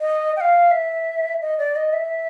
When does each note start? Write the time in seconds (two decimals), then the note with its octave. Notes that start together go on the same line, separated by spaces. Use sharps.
0.01 D#5
0.37 G5
0.41 F5
0.71 E5
1.42 D#5
1.59 D5
1.76 D#5
1.93 E5